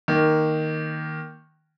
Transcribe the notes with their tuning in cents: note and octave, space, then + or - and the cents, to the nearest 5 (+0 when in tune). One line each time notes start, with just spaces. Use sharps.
D#3 +0 A#3 +0